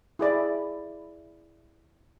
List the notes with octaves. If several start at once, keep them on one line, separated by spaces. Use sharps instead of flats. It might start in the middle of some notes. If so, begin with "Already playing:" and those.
E4 G#4 D5 B5